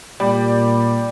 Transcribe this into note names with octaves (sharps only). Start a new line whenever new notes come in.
A#2 G3 D5